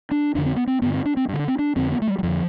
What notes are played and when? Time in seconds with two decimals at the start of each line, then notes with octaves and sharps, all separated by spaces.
0.11 D4
0.35 F2 D3 D4
0.46 C4
0.56 B3
0.67 C4
0.82 G2 D3 B3
0.94 C4
1.05 D4
1.17 C4
1.28 G2 D3
1.39 D4
1.48 C4
1.59 D4
1.76 F2 D3 C4
1.92 B3
2.02 A3
2.07 G3
2.19 G3
2.23 F2 D3 F3